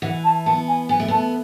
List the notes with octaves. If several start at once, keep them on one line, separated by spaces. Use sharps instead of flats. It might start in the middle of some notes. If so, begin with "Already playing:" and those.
E3 F#5
A5
B3 A5
G#5
B3 G#5
A3
B3 A5